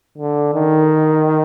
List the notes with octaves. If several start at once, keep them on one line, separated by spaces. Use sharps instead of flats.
D3
D#3